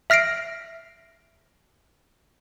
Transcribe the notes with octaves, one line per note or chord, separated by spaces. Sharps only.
E5 F6 A#6 C7 D7